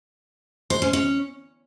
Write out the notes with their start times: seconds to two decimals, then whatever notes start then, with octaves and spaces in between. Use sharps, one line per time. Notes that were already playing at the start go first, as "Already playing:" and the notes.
0.70 C5
0.82 C#4
0.93 C#4